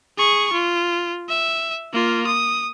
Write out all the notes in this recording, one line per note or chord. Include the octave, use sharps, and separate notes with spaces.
G#4 C#6
F4
E5
A#3 F4
D#6